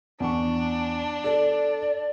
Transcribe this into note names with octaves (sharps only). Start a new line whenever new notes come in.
E2 D4 C#6
A4 D5